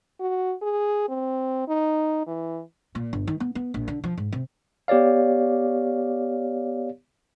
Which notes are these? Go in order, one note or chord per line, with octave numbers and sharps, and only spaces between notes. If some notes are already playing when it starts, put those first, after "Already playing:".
F#4
G#4
C4
D#4
E3
A#2
G1
D#3
B3
B3
A#1
D3
F3
G#2
C3
B3 G4 C#5 D5 F5